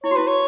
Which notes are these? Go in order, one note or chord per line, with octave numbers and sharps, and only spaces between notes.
E4 C#5
F#4
E4 B4
C#5